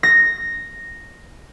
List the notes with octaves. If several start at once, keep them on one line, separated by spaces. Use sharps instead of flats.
A#6